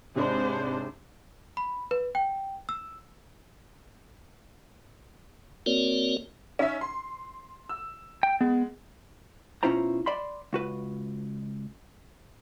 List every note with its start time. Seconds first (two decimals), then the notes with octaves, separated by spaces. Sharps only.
0.15 G#2 C3 G#3 D4 C5 C#5 B5
1.57 B5
1.91 B4
2.15 G5
2.69 E6
5.66 A#3 C4 F#4 A#4 C#5 D5
6.59 C#4 D#4 E5
6.81 C6
7.69 E6
8.23 G5
8.41 G#3 B3
9.63 B2 C#4 E4 F4 C5 A#5
10.06 D5 B5 C6
10.53 C#2 F#4 B4